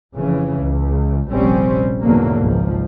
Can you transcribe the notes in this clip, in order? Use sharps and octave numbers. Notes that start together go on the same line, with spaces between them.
F1 C#3 E3
C#2
F1 A#1 G3 C4 C#4
E2 G#2 B2 D3 F#3 A#3
G#1 C#2 F3